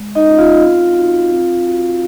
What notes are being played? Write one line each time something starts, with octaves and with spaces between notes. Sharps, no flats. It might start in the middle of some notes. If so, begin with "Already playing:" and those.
Already playing: G#3
D#4 D#5
C#4 F4
F4 F5
C4
D#4 F#4
C4
F#4